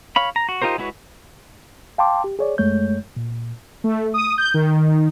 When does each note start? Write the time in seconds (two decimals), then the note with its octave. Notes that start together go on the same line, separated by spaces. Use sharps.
0.16 C#5 F5 B5
0.36 A#5
0.49 F#4
0.62 D#4 F4 G4 A#4 C5
0.78 G#3 E4 F#4 B4 C#5
1.98 F5 G5 A5 C6 D6
2.24 G4
2.39 G#4 C#5 D5
2.58 F#2 G#3 A3 C#5 G6
3.16 A#2
3.84 A3
4.14 D#6
4.38 G6
4.54 D#3